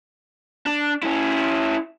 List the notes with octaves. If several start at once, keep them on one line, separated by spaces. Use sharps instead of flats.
D4
C#4 E4